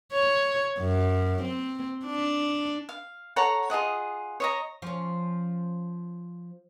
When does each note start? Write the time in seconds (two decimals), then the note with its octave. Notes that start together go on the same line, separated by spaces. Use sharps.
0.13 C#5
0.79 F#2
1.43 C4
2.06 D4
2.89 F5
3.36 A4 C#5 F#5 A#5
3.70 F4 G#4 D#5 F#5
4.40 C#5 D#5 A#5
4.82 F3 C#4